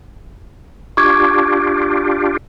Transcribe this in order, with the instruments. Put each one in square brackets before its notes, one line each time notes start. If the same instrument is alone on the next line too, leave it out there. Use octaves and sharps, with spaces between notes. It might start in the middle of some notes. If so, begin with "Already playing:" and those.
[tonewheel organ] D4 F4 G4 [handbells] C#6 D6 G#6